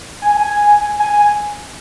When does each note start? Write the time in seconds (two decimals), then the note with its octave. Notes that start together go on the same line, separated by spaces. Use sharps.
0.22 G#5
0.37 G#5
1.00 G#5